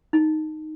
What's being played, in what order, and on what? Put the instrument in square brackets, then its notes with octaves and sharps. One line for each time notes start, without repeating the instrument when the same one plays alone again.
[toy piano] D#4